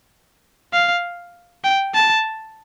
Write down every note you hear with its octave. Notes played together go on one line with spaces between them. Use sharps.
F5
G5
A5